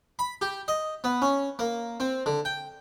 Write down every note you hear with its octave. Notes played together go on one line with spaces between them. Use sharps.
B5
G4
D#5
B3
C#4
A#3
C4
D3
G5